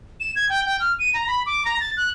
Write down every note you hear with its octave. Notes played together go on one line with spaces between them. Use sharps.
E7
G#6
G5
G5
F6
D#7
A#5
B5
D6
A#5
A6
F#6